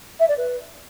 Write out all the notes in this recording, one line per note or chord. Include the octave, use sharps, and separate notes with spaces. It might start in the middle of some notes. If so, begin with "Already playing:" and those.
E5
D5
B4